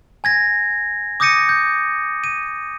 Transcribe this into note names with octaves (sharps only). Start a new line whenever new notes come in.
G#5 G#6 A#6
D6 D#6 G6 A#6 C#7 D#7
G6
D#7